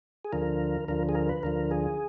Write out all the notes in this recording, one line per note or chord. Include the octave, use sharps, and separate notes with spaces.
G#4
D2 D3 F3 A#4
D2 D3 F3 A#4
G#4
A#4
B4
D2 D3 F3 A#4
G#4